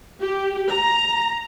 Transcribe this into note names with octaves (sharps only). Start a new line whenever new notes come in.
G4
A#5